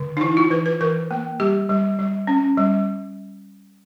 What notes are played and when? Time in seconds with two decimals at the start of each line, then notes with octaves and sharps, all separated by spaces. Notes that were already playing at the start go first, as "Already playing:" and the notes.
Already playing: D3
0.17 D#4
0.21 E3 E4
0.37 F4
0.51 E3 B4
0.66 B4
0.81 E3 A#4
1.11 A#3
1.40 G3 G4
1.69 G3
1.99 G3
2.27 C#4
2.58 G3